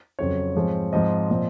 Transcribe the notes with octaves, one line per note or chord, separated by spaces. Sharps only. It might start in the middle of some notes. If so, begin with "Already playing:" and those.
F2 C#3 F#3 C4 C#5
G#2 F3 G#3 C4
G#2 F3 C4 D#5
A#2 F3 C4